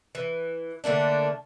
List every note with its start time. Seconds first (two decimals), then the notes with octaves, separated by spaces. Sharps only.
0.15 E3
0.84 D3 A3 A#3 D4